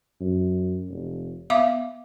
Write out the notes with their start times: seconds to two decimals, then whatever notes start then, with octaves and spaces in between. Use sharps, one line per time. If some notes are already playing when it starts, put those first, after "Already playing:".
0.21 F#2
0.89 F1
1.50 B3 E5 F5 D6